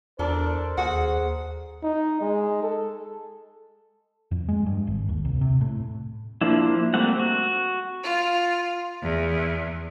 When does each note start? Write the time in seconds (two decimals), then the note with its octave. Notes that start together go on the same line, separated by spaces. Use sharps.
0.19 E2 D4 A4 A#4 C5 D5
0.77 D#2 G#4 F#5
1.83 D#4
2.21 G#3
2.63 A4
4.31 F2
4.49 G#3
4.66 G2
4.87 G#1
5.09 D#2
5.25 C2
5.41 C3
5.61 A2
6.41 F3 A#3 D4 E4
6.94 G3 A3 A#3 C4 F#5
7.19 F#4
8.03 F4
9.02 E2